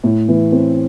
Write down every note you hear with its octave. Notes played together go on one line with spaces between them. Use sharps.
A2
E3
C4